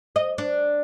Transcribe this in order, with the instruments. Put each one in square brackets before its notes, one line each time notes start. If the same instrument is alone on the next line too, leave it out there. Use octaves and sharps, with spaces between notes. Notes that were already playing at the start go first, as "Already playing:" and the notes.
[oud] D#5
D4